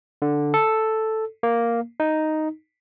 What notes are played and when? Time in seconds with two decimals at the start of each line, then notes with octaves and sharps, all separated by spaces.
0.22 D3
0.54 A4
1.43 A#3
2.00 D#4